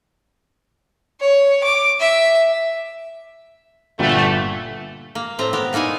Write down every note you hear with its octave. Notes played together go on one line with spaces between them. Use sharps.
C#5
D6
E5
G1 A#2 E3 G3 A3 F#5
A#3
A2 C4 E5 A#5
B3 G4 A#4
A#2 A#3 D#4 E4 G#5